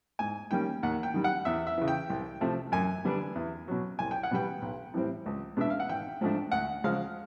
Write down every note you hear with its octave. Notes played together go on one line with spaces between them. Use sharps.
G#2 G#5
D#3 G3 A#3 C#4 G5
D#2 F#5
G5
D#3 G3
F#5
E2 E5
E5
C#3 E3
G5
C2
C3 F3 A3
F#2 G#5
D3 G3 B3 D4
E2
B2 F#3
C2 G#5
G5
F#5
B2 G3 B3 G5
B1
A2 E3 G3 C4
C#2
B2 G#3 B3 D4 E5
F5
F#5
G#1 G5
G#2 F3 A3 D4
D2 F#5
C#3 F3 G#3 F5